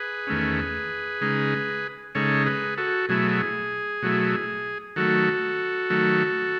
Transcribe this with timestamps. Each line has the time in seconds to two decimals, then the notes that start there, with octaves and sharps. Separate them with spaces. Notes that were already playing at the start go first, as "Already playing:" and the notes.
Already playing: G#4 B4
0.27 E2 D#3 A3 C#4
1.21 C#3 G#3 D#4
2.15 C#3 G#3 D#4 A4 C#5
2.46 G#4 B4
2.77 F#4 A4
3.09 B2 F#3 A3 E4 G#4
4.02 B2 F#3 A3 E4
4.96 D#3 F#3 A3 F#4 A4
5.90 D#3 F#3 A3